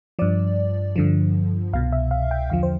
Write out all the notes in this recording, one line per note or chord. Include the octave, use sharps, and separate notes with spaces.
G2 F3 D5
G2 D3 F3
C2 B2 F5
E5
F5
G5
E2 D3 F3 F5
C5